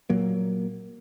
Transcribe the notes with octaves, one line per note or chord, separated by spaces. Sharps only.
A#2 F#3 A#3